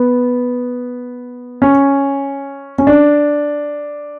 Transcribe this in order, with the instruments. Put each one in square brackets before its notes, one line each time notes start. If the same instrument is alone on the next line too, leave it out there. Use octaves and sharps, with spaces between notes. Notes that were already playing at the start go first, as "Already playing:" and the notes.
Already playing: [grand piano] B3
C#4
C#4
D4